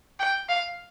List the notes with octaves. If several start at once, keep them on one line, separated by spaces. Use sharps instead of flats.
G5
F5